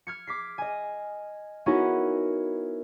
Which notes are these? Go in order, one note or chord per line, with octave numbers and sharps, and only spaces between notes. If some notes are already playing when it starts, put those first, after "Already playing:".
F6 G#6 C#7
D6 B6 C7
D#5 G#5
B3 C#4 D#4 E4 F#4 A#4